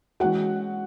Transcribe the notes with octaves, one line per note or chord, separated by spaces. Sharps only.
E3 G#3 C#4 F#4 F#5